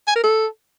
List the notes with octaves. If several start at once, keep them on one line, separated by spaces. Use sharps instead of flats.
G#5
A#4
A4